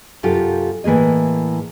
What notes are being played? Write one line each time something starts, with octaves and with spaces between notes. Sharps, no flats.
F#2 C3 F4 G4 A4
A2 E3 A#3 G#4 D#5